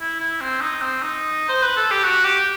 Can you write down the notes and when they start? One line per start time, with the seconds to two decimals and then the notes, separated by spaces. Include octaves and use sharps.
0.01 E4
0.20 E4
0.41 C4
0.61 D#4
0.82 C4
1.02 D#4
1.49 C5
1.62 B4
1.77 A4
1.91 G4
2.03 F#4
2.24 G4